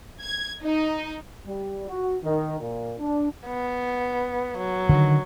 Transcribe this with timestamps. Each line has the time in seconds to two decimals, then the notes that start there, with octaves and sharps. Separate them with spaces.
0.20 G#6
0.62 D#4
1.46 G3
1.88 F#4
2.23 D#3
2.60 A#2
2.99 D4
3.47 B3
4.58 F#3
4.89 D3 D#3